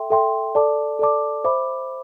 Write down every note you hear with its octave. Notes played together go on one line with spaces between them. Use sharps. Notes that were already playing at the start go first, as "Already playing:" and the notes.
Already playing: A4 E5 G5 C6
A4 E5 G5 C6
A4 D5 A5 D6
A4 D5 A5 D6
C5 E5 B5 D6